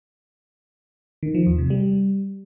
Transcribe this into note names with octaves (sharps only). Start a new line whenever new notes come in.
D#3
F3
E2
C3
G3